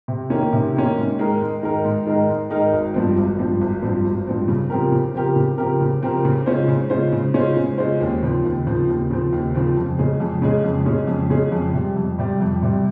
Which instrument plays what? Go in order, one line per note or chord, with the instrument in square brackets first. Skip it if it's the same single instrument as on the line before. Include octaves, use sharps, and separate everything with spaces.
[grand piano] C3
D#3 A#3 C#4
C3
D#3 A#3 C#4
G#2
D#3 G#3 D#4 A#4
G#2
D#3 G#3 D#4 A#4
G#2
D#3 G#3 D#4 A#4
G#2
D#3 G#3 D#4 A#4
G#1
G2 F3 C4
G#1
G2 F3 C4
G#1
G2 F3 C4
G#1
G2 F3 C4
C#3
F3 C4 G4 A#4
C#3
F3 C4 G4 A#4
C#3
F3 C4 G4 A#4
C#3
F3 C4 G4 A#4
C#3
G#3 C#4 F4 C5
C#3
G#3 C#4 F4 C5
C#3
G#3 C#4 F4 C5
C#3
G#3 C#4 F4 C5
D#2
C#3 F3 C4
D#2
C#3 F3 C4
D#2
C#3 F3 C4
D#2
C#3 F3 C4
F2
C#3 G#3 C#4 G#4
F2
C#3 G#3 C#4 G#4
F2
C#3 G#3 C#4 G#4
F2
C#3 G#3 C#4 G#4
F2
C3 G3
F2
C3 G3
F2
C3 G3